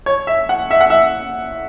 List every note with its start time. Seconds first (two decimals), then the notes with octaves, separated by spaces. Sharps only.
0.06 C#5
0.27 E5
0.49 F#5
0.71 E5
0.81 F#5
0.90 E5